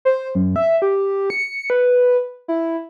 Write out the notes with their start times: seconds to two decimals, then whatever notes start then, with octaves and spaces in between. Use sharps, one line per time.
0.05 C5
0.35 F#2
0.56 E5
0.82 G4
1.30 C#7
1.70 B4
2.48 E4